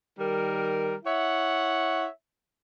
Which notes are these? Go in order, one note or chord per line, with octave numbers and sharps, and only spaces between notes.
D#3 G3 A#4
E4 C#5 E5 F#5